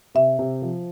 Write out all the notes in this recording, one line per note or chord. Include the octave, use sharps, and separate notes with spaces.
C3 E5
C3
F3